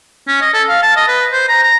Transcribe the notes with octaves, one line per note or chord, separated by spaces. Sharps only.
C#4
D#5
A4
F5
A5
D#5
B4
C5
A#5
A#5